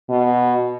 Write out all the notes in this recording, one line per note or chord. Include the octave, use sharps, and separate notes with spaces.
B2